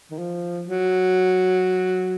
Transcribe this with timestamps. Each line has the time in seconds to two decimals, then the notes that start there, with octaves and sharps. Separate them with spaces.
0.11 D#3
0.18 F3
0.67 F#3